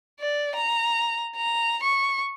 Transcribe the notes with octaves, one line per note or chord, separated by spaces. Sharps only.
D5
A#5
A#5
C#6